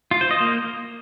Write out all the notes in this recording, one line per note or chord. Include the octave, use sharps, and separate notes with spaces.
F4
C5
D#5
A#3